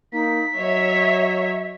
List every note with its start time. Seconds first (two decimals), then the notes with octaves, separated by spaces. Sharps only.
0.13 A#3 D#4 B6
0.57 F#3 C#5 D#5 E5